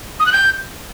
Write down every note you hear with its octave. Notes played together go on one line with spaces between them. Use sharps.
D#6
F#6
G6